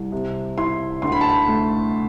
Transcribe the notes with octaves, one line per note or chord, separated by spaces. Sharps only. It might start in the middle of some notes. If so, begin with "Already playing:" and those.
Already playing: C2
C3
E4 C6
D2 C6
B5
A5
B5
A3